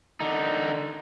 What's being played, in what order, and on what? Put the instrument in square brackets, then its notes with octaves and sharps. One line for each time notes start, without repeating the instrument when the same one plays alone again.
[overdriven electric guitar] D3 D#4